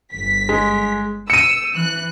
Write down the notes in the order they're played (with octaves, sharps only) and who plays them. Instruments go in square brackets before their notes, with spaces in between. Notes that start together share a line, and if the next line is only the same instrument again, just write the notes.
[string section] G1 B6
[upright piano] G#3
[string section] E6 [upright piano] C#7 D#7
[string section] E3 F#6